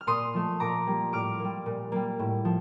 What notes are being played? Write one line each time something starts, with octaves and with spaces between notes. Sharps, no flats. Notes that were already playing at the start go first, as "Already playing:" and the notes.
F6
A#2 C6 D#6
F3 A3
A#2 A#5 D6
G3 A#3
A2 D6 F6
G3 A#3
A#2
G3 A#3
A2
F3